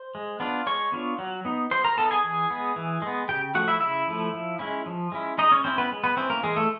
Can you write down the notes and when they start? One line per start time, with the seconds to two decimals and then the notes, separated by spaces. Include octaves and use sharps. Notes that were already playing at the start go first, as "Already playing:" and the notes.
Already playing: C5
0.15 G#3
0.40 B3 D4 F4
0.66 G#3 C#5 C#6
0.92 B3 D4 F4
1.18 F#3
1.45 B3 D#4
1.71 F#3 C5 C6
1.84 A#4 A#5
1.97 B3 D#4 A4 A5
2.11 G#4 G#5
2.24 E3
2.50 G#3 B3
2.76 E3
3.02 G#3 B3
3.29 C#3 G4 G5
3.55 F3 A3 F#4 F#5
3.68 E4 E5
3.81 C#3 E4 E5
4.08 F3 A3
4.33 F3
4.59 G#3 C#4 E4
4.86 F3
5.12 G#3 C#4 E4
5.38 G#3 D#4 D#5
5.52 C#4 C#5
5.64 C4 C#4 E4 C5
5.78 B3 B4
5.91 G#3
6.04 B3 B4
6.17 C4 C#4 E4 C5
6.30 A#3 A#4
6.43 E3 G#3 G#4
6.56 A3 A4